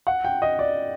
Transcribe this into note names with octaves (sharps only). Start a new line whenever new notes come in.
F#5
G5
D#5
D5